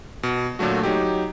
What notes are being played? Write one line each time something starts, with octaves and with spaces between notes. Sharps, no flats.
B2
A#2 D3 F#3 A3 F#4
F#3 D#4 G4